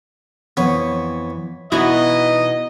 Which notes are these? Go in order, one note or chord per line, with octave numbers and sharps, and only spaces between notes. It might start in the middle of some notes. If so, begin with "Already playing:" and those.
F2 E3 B3 C#5
B2 E3 B3 D#4 E4 F#4 D#5